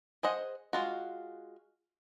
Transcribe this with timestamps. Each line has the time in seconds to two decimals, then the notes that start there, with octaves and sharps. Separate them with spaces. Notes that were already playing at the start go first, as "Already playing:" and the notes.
0.23 G#4 C5 D#5 F#5
0.73 G#3 F4 F#4